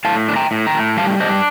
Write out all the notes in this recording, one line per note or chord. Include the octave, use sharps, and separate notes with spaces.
A2 F5 A5
D4
G5 A#5
A2
G5 A#5
A2
G3 F5 A5
D4 C5 D#5